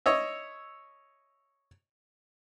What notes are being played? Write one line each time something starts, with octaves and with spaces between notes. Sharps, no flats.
C#5 D#5 E5